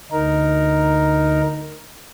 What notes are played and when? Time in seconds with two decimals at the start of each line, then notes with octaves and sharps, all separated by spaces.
0.12 D2 D#4 A#4